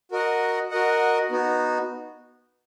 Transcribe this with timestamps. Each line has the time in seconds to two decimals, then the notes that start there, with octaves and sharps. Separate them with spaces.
0.11 F#4 A#4 D#5 F#5
0.71 F#4 A#4 D#5 F#5
1.31 B3 D#4 F#4